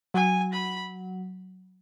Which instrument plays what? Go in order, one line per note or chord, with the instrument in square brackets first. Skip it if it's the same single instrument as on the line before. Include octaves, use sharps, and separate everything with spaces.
[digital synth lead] F#3 [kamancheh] G#5
[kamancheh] B5